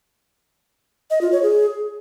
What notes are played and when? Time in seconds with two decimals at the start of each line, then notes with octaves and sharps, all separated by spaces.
1.10 D#5
1.21 F4
1.32 C#5
1.43 G#4